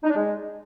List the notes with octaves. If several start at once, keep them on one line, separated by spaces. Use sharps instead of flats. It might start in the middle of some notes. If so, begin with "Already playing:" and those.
D#4
D4
G#3